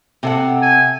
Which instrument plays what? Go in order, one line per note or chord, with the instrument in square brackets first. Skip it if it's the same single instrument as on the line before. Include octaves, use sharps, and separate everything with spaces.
[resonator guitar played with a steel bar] C3 A4 F#5
[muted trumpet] G#5